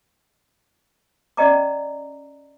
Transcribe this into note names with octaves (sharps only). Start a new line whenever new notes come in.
C#4 D5 D#5 A#5 D6